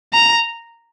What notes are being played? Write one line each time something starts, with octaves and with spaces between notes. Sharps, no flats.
A#5